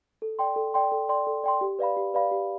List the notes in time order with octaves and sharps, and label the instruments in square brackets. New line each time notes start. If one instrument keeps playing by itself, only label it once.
[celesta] A4
D5 G5 C6
A4
D5 G5 C6
A4
D5 G5 C6
A4
D5 G5 C6
G4
B4 D5 F5 B5
G4
B4 D5 F5 B5
G4